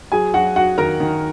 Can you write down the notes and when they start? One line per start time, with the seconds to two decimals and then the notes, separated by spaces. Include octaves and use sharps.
0.12 F#3 G#4 G#5
0.34 F#3 F#4 F#5
0.56 F#3 F#4 F#5
0.78 D#3 A#4 A#5
1.00 D#3